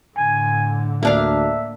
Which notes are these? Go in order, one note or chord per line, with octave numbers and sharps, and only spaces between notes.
A2 D3 G#5
D2 A#3 D4 E5 F5